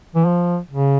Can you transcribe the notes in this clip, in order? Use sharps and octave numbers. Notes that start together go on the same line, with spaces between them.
E3
F3
C#3